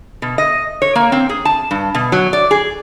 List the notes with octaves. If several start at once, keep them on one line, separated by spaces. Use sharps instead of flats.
B2
D#5
C#5
A#3
C4
G#4
A5
G2
B2
F#3
D5
G#4